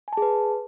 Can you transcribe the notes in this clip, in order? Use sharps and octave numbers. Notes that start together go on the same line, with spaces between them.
G#4 B4 G#5 A5